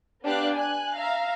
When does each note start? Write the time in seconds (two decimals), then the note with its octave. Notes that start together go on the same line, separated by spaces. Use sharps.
0.23 B3 D4 G4 D5 F5 F#6
0.54 G#5 F#6
0.96 E5 F5 A#5